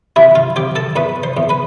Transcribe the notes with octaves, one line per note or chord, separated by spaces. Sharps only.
C3 E4 E5
F4 F5
C4 G4 G5
A4 A5
E2 B4 B5
C5 C6
E2
B4 B5